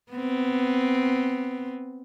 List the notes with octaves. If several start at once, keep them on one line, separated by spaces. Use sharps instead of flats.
B3 C4